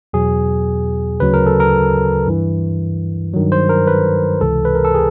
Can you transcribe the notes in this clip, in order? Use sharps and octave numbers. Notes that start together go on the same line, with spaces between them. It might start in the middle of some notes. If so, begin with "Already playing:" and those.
E2 B2 F#3 G#4
D2 C#3 F#3 B4
A#4
A4
A#4
G2 E3
G2 D#3 F#3
C5
A#4
B4
C#2 C3 E3 A4
B4
A#4
A4
G#4